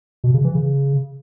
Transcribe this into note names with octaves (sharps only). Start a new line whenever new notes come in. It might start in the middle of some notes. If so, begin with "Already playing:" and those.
B2
C#3
E3
C#3